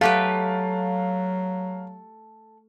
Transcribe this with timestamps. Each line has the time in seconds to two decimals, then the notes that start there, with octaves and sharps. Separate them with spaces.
0.01 F#3 A3 G4 A4 B4 F5 F#5